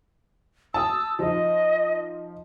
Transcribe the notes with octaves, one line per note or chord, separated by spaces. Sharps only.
A5 D#6 E6
F3 D#4 D#5